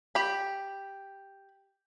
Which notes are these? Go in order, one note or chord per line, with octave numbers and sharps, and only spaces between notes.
G4 B5